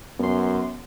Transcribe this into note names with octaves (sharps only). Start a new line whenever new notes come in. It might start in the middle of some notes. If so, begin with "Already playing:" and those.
F#2 B3 C6